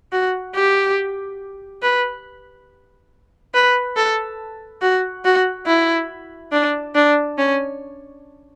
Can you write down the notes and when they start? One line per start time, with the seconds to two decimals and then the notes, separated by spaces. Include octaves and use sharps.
0.12 F#4
0.55 G4
1.83 B4
3.54 B4
3.96 A4
4.81 F#4
5.25 F#4
5.67 E4
6.53 D4
6.95 D4
7.38 C#4